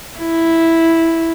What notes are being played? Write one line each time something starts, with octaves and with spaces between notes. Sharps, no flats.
E4